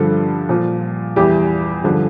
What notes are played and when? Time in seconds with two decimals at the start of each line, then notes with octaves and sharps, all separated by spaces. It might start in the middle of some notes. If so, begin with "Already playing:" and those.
Already playing: G2 D3 F3 A4
0.49 A#2 F3
1.16 E2 E3 G3 G4
1.84 G2 D3 F3